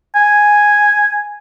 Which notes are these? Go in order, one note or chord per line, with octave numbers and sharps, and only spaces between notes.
G#5